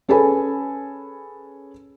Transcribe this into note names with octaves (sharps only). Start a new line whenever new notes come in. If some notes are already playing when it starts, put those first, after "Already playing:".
C#4 G#4 A4 B4 G#5 B5